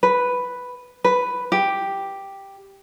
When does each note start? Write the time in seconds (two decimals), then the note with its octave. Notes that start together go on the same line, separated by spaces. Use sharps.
0.03 B4
1.04 B4
1.52 G4